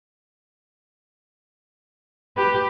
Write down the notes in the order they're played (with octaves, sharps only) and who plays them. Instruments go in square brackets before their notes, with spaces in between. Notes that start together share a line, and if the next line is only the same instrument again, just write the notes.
[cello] G4 [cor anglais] B4